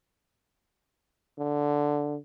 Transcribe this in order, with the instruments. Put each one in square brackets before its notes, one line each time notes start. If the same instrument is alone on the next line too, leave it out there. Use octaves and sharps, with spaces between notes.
[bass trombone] D3